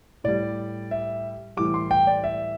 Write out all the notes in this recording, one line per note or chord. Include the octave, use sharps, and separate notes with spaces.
A2 G3 D5
E5
A2 E3 G3 D6
C6
G5
D5
E5